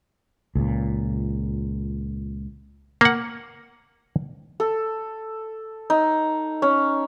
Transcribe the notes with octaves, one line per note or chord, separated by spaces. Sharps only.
C#2 A#2
A#3 F#5
A4
D#4
C#4